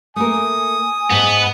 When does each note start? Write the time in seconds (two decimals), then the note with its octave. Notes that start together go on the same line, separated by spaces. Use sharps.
0.16 A3 A#3 A#4 G#5 D#6
1.11 G#2 B3 A5